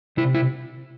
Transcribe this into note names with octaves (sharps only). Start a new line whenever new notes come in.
C3 E4
E4